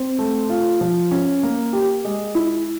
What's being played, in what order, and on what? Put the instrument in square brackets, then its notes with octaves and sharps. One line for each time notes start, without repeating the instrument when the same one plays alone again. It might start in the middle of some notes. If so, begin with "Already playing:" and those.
Already playing: [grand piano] C4
A3
F4
F3
C#4
A#3
G4
G#3
E4